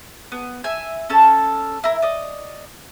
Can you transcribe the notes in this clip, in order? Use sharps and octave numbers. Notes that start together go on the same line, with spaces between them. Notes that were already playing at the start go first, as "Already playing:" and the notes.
B3
E5 G#5
C#4 A4 A5
E4 A#4
D5 D#5